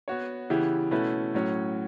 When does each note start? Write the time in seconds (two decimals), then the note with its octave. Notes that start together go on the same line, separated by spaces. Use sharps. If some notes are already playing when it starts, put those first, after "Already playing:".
0.08 B3 F#4 C#5
0.50 C#3 E3 B3 E4 G4
0.91 B2 A3 C#4 E4 B4
1.34 A2 F#3 C#4 F#4 C#5